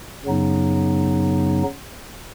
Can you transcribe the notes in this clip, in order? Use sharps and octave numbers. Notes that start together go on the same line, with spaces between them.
F#2 C#3 F#3 B3 D#4